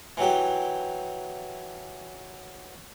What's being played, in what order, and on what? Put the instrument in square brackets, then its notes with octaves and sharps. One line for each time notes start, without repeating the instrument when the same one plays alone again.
[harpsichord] E3 F#3 G4